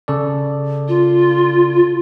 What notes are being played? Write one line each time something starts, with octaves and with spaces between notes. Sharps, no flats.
C#3 A4 D5
F4